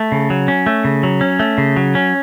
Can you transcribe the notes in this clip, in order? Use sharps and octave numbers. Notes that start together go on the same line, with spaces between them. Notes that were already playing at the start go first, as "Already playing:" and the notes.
Already playing: A3
C#3
F#3
C#4
A3
C#3
F#3
C#4
A3
C#3
F#3
C#4